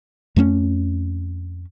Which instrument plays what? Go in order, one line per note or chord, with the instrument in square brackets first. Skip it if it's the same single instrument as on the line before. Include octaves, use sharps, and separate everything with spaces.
[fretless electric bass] F2 A3 A#3 C#4